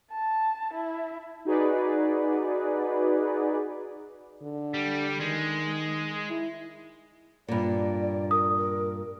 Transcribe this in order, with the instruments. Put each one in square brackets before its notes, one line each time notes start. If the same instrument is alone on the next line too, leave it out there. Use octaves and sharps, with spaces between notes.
[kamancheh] A5
E4
[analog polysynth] D#4 F#4 G#4 B4 D5
[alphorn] D3
[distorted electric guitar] G3
[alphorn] D#3 [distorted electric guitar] G#3
[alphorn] E4
[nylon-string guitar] G2 A#2 [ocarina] D5
[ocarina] A#4 [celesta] D#6
[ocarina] A#4